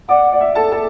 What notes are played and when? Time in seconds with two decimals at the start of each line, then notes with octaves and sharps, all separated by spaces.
0.09 D5 F#5 D6
0.32 D5
0.41 E5
0.55 A4 A5
0.72 A4 A5